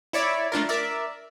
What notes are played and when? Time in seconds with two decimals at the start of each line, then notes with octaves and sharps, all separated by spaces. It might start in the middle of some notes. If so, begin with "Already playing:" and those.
0.13 E4 C#5 D5 E5
0.52 A3 D4 F4 A#4
0.69 A#4 D5 E5